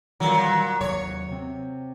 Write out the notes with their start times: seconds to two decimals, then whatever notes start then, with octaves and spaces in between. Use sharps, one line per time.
0.20 A#2 D#3 E3 F#3 G3
0.81 D#2 C3 F#3 C#5
1.28 C3 C4